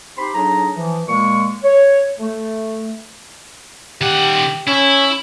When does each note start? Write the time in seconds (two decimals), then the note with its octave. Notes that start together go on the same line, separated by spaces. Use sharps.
0.17 C4 D#4 G4 B5 C6
0.34 A2 F#3 D4 D#4 G#4 A#5
0.76 E3 F3
1.08 A#2 G#3 A#3 C#6
1.64 C#5
2.19 A3
4.01 D#3 G4 F#5
4.68 C#4 E4